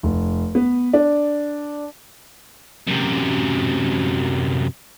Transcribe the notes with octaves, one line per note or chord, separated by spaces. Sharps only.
F1
B3
D4
F#2 C3